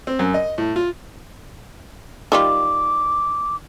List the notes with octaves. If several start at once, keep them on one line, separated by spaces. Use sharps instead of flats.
C4
F#2
D#5
A2
F4
D#3 G3 F4 D6